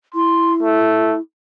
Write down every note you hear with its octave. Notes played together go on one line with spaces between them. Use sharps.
E4 C6
A3